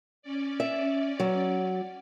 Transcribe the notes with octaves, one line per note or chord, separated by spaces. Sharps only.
C#4 D5
E5
F#3